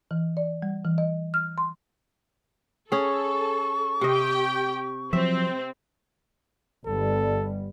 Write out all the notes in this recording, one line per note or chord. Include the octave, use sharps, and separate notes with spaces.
E3
D5
G3
E3
D#5
F6
C6
C#4 G#4 A4 C#6
C3 G4 D#5 G5
F3 F#3 C4 E5
G1 G3 B3 A4